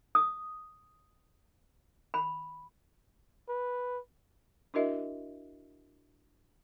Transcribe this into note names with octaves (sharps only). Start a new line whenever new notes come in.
D#6
B5
B4
D4 E4 F#4 A#4 D#5 E5